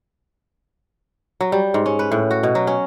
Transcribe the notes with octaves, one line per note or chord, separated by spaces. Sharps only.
F#3
G3
G#2
C#4
B4
A2
F#4
B2
F#3
C#4